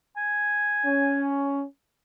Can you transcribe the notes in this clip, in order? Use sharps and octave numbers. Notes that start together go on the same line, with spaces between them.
G#5
C#4